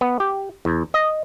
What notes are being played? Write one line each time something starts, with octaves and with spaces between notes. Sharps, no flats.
B3
G4
E2
D#5